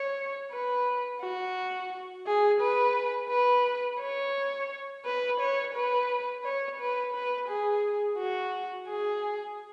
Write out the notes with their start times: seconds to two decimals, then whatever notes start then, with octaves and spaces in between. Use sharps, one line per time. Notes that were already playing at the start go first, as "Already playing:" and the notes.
Already playing: C#5
0.52 B4
1.21 F#4
2.26 G#4
2.61 B4
3.30 B4
4.01 C#5
5.05 B4
5.40 C#5
5.75 B4
6.44 C#5
6.80 B4
7.14 B4
7.49 G#4
8.18 F#4
8.88 G#4